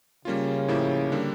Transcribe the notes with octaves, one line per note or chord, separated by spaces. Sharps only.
C#3 G3 A#3 C#4 F4
A2 F3 A#3 E4 G4
D3 G3 A#3 D4